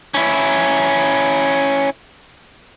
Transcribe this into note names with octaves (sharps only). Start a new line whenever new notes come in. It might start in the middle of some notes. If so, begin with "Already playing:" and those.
C#4 E4